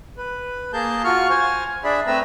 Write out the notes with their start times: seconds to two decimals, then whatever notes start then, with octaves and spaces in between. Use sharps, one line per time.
0.17 B4
0.73 A#3 G#4 A#4 A5 G6
1.04 F4 F#4 C#6 F6
1.30 C5 G#5 F6
1.84 D4 G#4 D5 E5 B5
2.07 A3 C4 B4 E5 A#5 E6